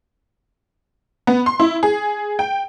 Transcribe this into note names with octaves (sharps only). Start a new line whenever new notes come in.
B3
C6
E4
G#4
G5